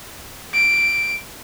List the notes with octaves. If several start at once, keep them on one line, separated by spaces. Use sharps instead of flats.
D7